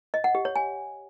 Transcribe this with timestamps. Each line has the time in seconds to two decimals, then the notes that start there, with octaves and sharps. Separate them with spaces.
0.14 D#5
0.24 F#5
0.35 G4
0.45 C#5
0.56 G#5